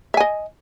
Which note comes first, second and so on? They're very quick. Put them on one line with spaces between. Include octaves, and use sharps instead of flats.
E5 G#5 D#5